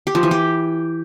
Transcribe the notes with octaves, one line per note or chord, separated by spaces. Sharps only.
G4
F3
E3
G4